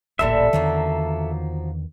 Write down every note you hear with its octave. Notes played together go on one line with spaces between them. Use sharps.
D1 A1 A#2 D3 E3 G3 A4 E5
E2 D3 D#3 F3 F#3 A#3